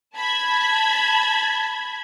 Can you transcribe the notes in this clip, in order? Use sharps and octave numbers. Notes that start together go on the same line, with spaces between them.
A5 B5 G#6